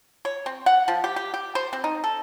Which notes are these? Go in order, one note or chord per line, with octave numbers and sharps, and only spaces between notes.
C#5
C4
F#5
F3
G4
G4
G4
C5
C4
D#4
A4